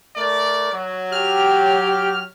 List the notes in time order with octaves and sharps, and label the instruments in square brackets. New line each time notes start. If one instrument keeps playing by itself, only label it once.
[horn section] A3 A#4 D5
F#3
[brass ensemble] G4 [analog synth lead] F6